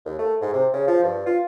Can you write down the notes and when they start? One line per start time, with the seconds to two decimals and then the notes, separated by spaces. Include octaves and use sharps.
0.06 D#2
0.19 A3
0.41 G#2
0.53 C3
0.73 C#3
0.87 F3
1.03 G2
1.26 F4